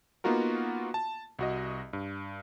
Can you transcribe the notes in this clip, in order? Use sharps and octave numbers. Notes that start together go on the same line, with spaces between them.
A#3 B3 D#4 F4 F#4 A#4
A5
C2 F#4 D#5
G2